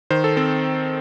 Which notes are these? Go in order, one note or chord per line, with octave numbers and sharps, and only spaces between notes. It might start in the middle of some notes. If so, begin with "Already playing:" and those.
D#3 C5
A4
C4 A4